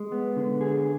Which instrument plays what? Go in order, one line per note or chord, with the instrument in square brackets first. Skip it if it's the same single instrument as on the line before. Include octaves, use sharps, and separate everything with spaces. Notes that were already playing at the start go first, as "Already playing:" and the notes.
Already playing: [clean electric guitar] G#3
B3
D3
G#4